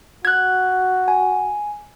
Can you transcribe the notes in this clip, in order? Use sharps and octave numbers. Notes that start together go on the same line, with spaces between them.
F#4 F#6 G#6
G#5